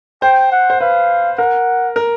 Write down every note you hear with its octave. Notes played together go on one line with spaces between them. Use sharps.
C5 G5
F#5
C5
B4 F5
A#4 F#5
A#4